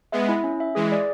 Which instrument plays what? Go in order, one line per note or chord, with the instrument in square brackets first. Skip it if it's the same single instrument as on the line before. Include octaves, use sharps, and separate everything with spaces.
[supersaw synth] G#3 B3 [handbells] E5
[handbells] E4
C#4
E5
[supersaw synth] E3 G#3 [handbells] G#4
[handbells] D5